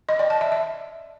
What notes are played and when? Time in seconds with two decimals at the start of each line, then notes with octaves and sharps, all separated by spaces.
0.09 D#5
0.19 D5
0.30 A5
0.41 E5
0.52 E5